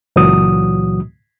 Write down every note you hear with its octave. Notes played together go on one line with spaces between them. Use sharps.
C#2 A#2 E3 F#3 F#4 D#6